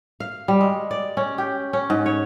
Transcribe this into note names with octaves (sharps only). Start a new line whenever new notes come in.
F5
G3
G#3
D5
C#4
G4
C#4
G#2
C#5